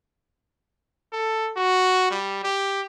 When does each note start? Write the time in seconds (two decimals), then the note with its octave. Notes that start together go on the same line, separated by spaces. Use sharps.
1.13 A4
1.57 F#4
2.10 G3
2.44 G4